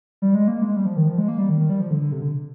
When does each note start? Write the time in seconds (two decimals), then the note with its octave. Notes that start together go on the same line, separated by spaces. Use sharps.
0.22 G3
0.35 G#3
0.48 A#3
0.62 G#3
0.76 G3
0.86 F3
0.97 D#3
1.07 F3
1.18 G#3
1.28 A#3
1.39 G3
1.49 D#3
1.60 D#3
1.70 G3
1.80 F3
1.91 D3
2.01 D3
2.12 C3
2.22 D3